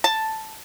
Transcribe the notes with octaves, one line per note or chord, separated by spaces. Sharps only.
A5